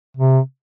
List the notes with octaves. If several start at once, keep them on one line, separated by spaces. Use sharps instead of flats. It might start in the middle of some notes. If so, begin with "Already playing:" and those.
C3